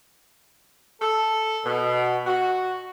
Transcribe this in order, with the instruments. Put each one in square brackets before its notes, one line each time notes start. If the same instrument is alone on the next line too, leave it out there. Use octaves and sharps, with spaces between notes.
[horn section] A4
B2
F#4